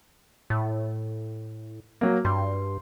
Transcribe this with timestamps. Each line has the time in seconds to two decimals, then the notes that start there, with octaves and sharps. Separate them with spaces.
0.50 A2
2.01 F#3 A#3
2.25 G2 C6